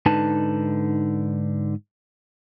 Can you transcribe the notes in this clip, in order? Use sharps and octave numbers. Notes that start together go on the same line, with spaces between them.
G#2 D3 D#4 B4 A5